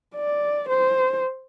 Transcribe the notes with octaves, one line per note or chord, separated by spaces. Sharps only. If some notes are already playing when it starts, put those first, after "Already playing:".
D5
C5